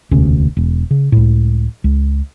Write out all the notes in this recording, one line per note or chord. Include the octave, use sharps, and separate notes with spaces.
E1 D2 C3 C#4
E1
C#3
C#2 A2
C#2